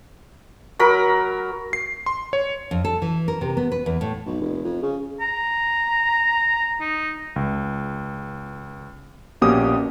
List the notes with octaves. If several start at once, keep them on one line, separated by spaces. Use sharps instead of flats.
F#3 A#4 B5
C7
C6
C#5
F2
A4
E3
A#4
C3
B3
B4
E2
A2
B1
F1
F2
C#3
A#5
D#4
C#2
A#1 B2 A#3 C#4 G4 D#6